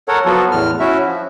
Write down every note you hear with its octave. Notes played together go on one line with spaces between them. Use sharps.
A4 A#4 C#5 F#5
F3 F#3 B3 F4 F#4 A4
E2 A2 F6
C#4 E4 F#4 E5
F3